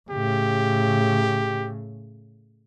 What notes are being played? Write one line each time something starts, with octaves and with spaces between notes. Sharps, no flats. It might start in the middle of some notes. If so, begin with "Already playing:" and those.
A2 C#3 G4